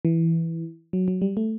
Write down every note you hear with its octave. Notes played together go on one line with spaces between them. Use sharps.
E3
F#3
F#3
G3
A3